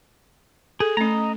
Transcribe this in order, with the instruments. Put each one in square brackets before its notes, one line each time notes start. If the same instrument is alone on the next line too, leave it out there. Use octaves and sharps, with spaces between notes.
[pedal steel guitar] G#4 [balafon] A4
[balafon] A3 C#4 [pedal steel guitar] D#5 A#5